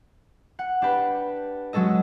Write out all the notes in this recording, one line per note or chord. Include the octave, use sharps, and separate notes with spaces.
F#5
D4 G4 B4
F#3 G#3 C#4 A4 D#5